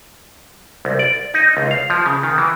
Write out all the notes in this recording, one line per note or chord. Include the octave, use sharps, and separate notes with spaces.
C2
D5
D#4
C#2
F5
F3
C#3
D#3
E3